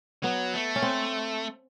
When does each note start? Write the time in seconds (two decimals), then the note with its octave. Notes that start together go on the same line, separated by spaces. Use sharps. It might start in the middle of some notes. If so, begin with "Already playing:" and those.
0.23 F#3 B3
0.54 A3
0.76 C#4
0.82 C4